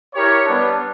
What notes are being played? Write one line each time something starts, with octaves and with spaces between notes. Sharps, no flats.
E4 G4 A#4 C#5
G3 B3 D4